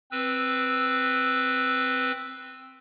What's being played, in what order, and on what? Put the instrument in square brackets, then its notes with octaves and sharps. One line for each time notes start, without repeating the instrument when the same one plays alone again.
[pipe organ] C4 B4 E6